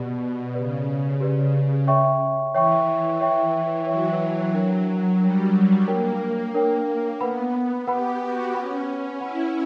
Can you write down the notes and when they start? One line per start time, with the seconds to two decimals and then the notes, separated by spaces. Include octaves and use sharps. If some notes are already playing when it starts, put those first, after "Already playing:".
Already playing: B2 G4 B4 D5
0.54 C#3 G4 B4 D5
1.20 G4 B4 D5
1.87 C#5 E5 G5 C#6
2.54 E3 C#5 E5 G5 C#6
3.21 C#5 E5 G5 C#6
3.87 F#3 C#5 E5 G5 C#6
4.54 D4 A#4 C#5 G5
5.20 G3 D4 A#4 C#5 G5
5.87 A#3 D4 A#4 C#5 G5
6.54 D4 A#4 C#5 G5
7.21 B3 B4 F#5 B5
7.87 G4 B4 F#5 B5
8.20 F#4
8.54 C#4 B4 F#5 B5
9.20 E4 B4 F#5 B5